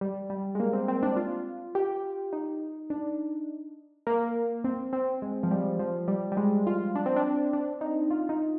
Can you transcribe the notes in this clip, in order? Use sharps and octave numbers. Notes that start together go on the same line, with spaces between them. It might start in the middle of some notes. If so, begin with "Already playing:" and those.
G3
G3
G#3
A#3
C4
C4
D4
F4
G4
D#4
D4
A#3
C4
C4
G#3
F3
G3
F3
G3
G3
G#3
F4
D4
C4
D4
D4
D#4
F4
D#4